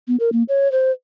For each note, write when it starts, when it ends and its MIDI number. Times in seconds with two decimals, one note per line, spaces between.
0.08 0.16 59
0.20 0.30 70
0.32 0.43 58
0.49 0.71 73
0.72 0.91 72